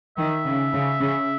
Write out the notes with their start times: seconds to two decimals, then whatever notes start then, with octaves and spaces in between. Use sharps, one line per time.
0.17 D#3 E5
0.45 C#3
0.73 C#3
1.00 C#3